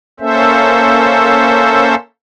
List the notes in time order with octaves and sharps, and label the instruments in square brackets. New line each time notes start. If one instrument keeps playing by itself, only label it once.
[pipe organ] A#3 C#4 A4 C5 E5